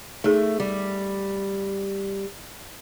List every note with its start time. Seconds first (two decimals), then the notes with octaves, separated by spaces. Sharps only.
0.24 A3 D#4 G#4
0.60 G3